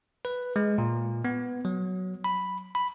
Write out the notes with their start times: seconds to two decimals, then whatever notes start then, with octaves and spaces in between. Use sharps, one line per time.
0.25 B4
0.56 G#3
0.78 A#2
1.25 B3
1.65 F#3
2.24 B5
2.75 B5